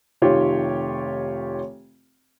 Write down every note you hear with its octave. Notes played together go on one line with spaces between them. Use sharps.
F1 D#3 F4 G4 C#5